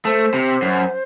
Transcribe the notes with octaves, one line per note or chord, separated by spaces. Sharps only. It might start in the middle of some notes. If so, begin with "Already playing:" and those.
A3 C5
C3
F#2